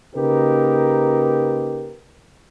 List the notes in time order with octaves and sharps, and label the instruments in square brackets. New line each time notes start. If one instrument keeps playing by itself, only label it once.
[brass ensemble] C#3 A#3 D#4 G4 A#4 B4